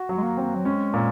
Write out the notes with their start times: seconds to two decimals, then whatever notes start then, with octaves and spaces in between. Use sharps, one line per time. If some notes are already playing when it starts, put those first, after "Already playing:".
Already playing: F#4
0.09 F#3
0.18 G#3
0.23 A#3
0.37 C4
0.55 F#3
0.65 G#3 C#4
0.93 A#2